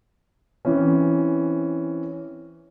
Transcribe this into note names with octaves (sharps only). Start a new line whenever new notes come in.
E3 C4 C#4